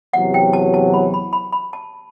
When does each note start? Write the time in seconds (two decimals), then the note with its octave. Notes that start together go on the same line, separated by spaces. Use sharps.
0.13 E2 C3 F#3 F#5
0.34 G5
0.53 A5
0.74 A5
0.94 B5
1.14 B5
1.33 B5
1.53 B5
1.73 A5